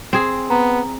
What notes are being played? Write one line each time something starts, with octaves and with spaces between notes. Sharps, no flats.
C4 G#4
B3 A#5